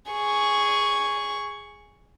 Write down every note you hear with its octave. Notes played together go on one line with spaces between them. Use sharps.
G#4 C#6